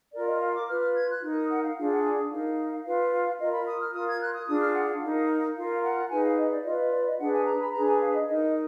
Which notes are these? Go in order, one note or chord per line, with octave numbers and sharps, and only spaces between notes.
F4 A#4 D5
D#5
F5
D6
F4 B4 F6
F6
G#6
F#6
D#4 A#4
D#6
F#5
F5
D4 F4 G#4 F5
F#5
G#5
D#4 A#4 F5
F4 B4 F5
F4 A#4 D#5
B5
D#6
F6
F4 A#4 D#6
G#6
F#6
D#6
D4 F4 G#4 D#6
F6
F#5
F5
D#4 A#4
F4 A#4 F5
F#5
D#4 G#4 B4 G#5
F5
D#5
D5
F4 B4 D#5
D#5
D5
D#5
D4 G#4 B4 F#5
G#5
A#5
B5
D4 G#4 B4 A#5
G#5
F5
D#5
D#4 A#4 D#5